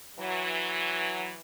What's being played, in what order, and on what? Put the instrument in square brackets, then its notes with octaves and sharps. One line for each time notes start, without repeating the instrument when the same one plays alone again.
[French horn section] E3 F#3